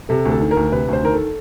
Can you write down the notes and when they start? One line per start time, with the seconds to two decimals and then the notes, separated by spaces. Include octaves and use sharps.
0.09 C3 A4
0.25 D2
0.30 A4
0.41 D#3
0.51 A#4
0.56 D2
0.72 C3 B4
0.88 D2 C5
1.03 D#3 A#4
1.14 A4